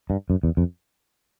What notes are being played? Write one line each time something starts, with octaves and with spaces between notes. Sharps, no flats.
G2
F#2
E2
F2